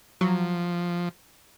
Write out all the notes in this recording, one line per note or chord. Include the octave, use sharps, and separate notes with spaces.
F3 F#3